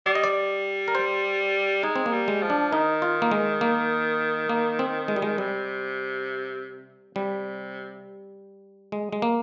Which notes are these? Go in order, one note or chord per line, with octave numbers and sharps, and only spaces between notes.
G3 D5
D#5
D5
A#4
C5
G#3 D#4
C4
A#3
G3
G#3
F3
D4
D#3 D#4
F4
A#3
G#3
A#3
A#3
C4
G#3
G3
G#3
C3 G3
C3 G3
G#3
G#3
A#3